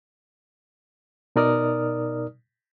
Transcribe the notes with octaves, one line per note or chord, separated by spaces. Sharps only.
B2 D#4 A#4 D5 D#6 F6